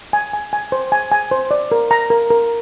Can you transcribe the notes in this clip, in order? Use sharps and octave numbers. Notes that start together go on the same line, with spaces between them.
G#5
G#5
G#5
C5
G#5
G#5
C5
D5
A#4
A#5
A#4
A#4